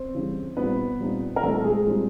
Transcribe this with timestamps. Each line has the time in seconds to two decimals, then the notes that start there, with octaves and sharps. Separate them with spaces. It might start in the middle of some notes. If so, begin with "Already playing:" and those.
Already playing: C4 C5
0.14 C#3 E3 G3
0.57 A#2 G3 B3 C4 D#4 B4
1.00 A#2 G3 C4 D#4
1.36 A#4
1.42 A#2 G3 A3 C4 D#4 A4
1.60 A4
1.64 G#3 G#4
1.87 A#2 G3 C4 D#4